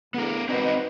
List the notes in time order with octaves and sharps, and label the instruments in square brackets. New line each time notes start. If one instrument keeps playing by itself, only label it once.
[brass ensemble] E2 D3 [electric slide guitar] B3 A#4
[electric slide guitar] C4 D#4 F#4 [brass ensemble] B4 D5 D#5